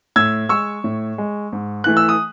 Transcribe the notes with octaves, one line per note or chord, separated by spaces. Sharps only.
A2 E6 G#6
G#3 C#6 E6
A2
G#3
G#2
E3 A3 F#6
E6
D#6